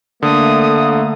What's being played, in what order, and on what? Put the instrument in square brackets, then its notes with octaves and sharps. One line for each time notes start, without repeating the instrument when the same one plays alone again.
[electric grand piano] D3 [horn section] A3 A#3 [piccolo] D#6